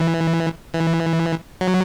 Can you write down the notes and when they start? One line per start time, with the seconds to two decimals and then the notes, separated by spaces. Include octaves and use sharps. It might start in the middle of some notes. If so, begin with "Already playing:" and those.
Already playing: E3
0.74 E3
1.61 F#3